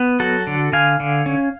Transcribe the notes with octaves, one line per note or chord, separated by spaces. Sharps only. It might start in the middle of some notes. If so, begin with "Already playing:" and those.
Already playing: B3
F#3 F#4 A4
D3
D3 F5 G#5
D3
C#4